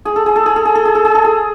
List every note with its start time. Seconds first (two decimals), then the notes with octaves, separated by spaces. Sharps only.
0.05 G#4
0.16 A4
0.26 G#4
0.36 A4
0.46 G#4
0.56 A4
0.65 G#4
0.75 A4
0.85 G#4
0.95 A4
1.05 G#4
1.15 A4
1.24 G#4